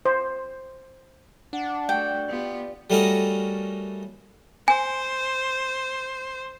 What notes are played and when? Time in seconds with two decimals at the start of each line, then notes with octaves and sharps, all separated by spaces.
0.05 C5
1.53 D4 F#5
1.89 A3 F#4 G5
2.28 B3 F4 G4 D5
2.90 G3 A3 C#4 F#4 A#4 D#5
4.68 C5 G#5